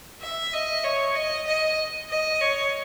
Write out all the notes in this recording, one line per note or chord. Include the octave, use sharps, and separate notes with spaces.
E5
D#5
C#5
D#5
D#5
D#5
C#5